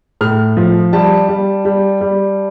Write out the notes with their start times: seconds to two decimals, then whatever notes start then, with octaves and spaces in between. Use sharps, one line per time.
0.21 A2 F6
0.57 F3
0.93 G3 A5
1.28 G3
1.65 G3
2.01 G3